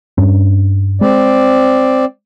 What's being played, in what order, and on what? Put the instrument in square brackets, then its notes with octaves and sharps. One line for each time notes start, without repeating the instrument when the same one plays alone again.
[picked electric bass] G2 C#4 D4
[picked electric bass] G#3 [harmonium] C4 D5